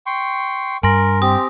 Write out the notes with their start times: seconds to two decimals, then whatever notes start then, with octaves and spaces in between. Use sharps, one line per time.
0.06 G5 C6 C#6
0.83 G2 A#4 G#5 C6 A#6
1.22 C4 G4 D#6